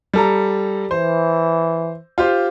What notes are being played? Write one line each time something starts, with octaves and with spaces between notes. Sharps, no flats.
G3 A4 A#5
E3 C5
F4 G4 C5